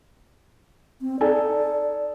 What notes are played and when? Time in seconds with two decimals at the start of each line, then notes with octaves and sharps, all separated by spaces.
1.02 C4
1.20 D#4 A4 D5 G#5